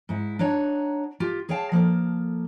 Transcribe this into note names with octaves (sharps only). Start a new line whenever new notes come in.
G#2 E4
D4 D#4 C#5 F#5
F4 G4
G#4 C#5 F5 G5 A5
F3 A#3 A4